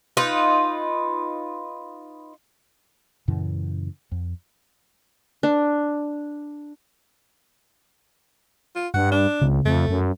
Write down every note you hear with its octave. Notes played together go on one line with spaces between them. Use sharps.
D#4 F4 B4
F#2 A#2 C#3 E3
F2
D4
F4
G2 F#5
D4
C#2 C#3 C4
F2 A3
F#2